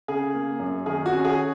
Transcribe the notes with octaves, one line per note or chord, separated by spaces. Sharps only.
C#3 G#4
A#3
F#2
D#3 G#4
F#4
C#4
G#4